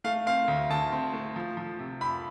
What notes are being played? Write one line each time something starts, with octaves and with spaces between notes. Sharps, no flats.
A3 F5
C4 F5
D2
D2 A5
C4
A3
F3
F3
C3
F2 B5